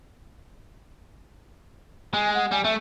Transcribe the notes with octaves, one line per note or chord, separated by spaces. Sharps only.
G#3 G#5
F#5
G3 G#5
A3 E5